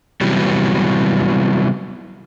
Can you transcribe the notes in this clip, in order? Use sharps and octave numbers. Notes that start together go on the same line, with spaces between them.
C3 E3 F#3 G3 B3